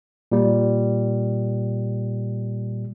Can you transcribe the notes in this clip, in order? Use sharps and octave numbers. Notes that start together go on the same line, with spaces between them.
A#2 G3